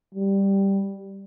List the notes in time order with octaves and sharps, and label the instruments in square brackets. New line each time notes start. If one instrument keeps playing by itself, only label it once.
[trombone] G3